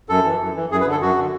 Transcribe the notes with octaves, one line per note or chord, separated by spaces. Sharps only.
F#2 A4
E3
F#2
E3
F#2 G#4
B4
D3 A4
F#2 F#4
D3